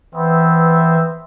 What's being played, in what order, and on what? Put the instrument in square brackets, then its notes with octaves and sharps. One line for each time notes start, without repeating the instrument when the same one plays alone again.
[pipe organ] E3 [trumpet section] B3 C4 E5